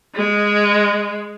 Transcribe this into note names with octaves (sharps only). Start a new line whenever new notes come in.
G#3